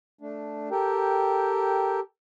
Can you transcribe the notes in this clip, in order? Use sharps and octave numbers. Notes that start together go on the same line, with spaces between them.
A3 D4
G4 A4 A#4 G5